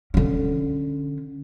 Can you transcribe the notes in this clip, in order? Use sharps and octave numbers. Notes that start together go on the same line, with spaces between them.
D3 C#4